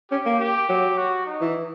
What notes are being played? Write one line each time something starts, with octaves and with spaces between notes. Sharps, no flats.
C#4 G4
A#3
G4
F#3
F#4
D#4
E3